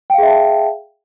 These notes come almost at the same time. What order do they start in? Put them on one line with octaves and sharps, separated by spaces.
G5 F5 G#4 E5 A5